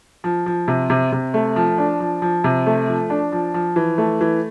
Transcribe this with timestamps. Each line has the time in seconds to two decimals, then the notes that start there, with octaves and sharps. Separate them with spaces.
0.24 F3
0.46 F3
0.68 C3
0.90 C3
1.12 C3
1.34 A3
1.56 F3
1.78 D4
2.00 F3
2.22 F3
2.44 C3
2.66 A3
2.88 F3
3.10 D4
3.32 F3
3.54 F3
3.76 E3
3.98 A3
4.21 E3